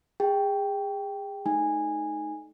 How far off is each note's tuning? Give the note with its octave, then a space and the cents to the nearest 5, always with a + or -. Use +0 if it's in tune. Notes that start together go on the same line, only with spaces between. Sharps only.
G#4 -30 G5 +0
A3 -35 D#4 +0 G#5 -15